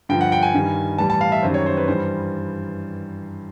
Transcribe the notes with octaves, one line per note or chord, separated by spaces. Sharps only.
G2 D3 F3 G5
F#5
G5
G#5
G2 D#3 G3
A2 E3 G3 A5
A5
F5
E5
F#2 D#3 G3 C5
C#5
C5
B4
G2 E3 G3 C5